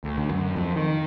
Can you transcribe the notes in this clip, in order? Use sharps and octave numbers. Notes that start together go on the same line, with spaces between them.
D2
D2
F#2
F2
D#3